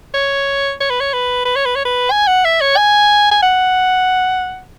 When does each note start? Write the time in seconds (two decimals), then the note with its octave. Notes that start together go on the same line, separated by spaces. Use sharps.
0.14 C#5
0.81 C#5
0.90 B4
1.00 C#5
1.13 B4
1.45 B4
1.56 C#5
1.66 B4
1.76 C#5
1.85 B4
2.11 G#5
2.27 F#5
2.45 E5
2.61 C#5
2.77 G#5
3.32 G#5
3.43 F#5